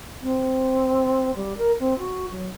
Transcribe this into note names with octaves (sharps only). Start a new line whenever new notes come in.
C4
G3
A#4
C4
F#4
F#3